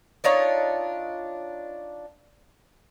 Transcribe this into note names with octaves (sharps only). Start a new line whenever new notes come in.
D4 D#4 F4 C#5